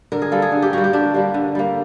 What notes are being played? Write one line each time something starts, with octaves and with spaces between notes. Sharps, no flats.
D3 A#4
G#4
G3 A#3 A4
G#4
D3
G4
G3 A#3 F#4
G4
D3 D4
G3 A#3
D3
G3 A#3